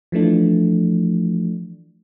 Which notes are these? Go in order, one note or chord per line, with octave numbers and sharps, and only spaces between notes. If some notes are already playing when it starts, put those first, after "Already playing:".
E3 F3 A3 D4